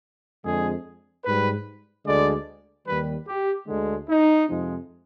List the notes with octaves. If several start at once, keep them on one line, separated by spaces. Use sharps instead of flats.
F2 D3 G#3 G#4
G#2 G3 B4
D2 D3 G#3 D5
D#2 D#3 G3 B4
G4
D2 D3 G#3
D#4
F2 C3 F3 G#3